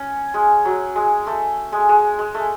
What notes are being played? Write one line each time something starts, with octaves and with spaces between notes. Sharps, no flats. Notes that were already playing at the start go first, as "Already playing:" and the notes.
Already playing: C#4
G#3
F#3
G#3
A3
G#3
G#3
G#3
A3